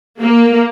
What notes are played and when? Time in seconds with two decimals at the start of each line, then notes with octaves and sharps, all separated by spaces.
0.21 A#3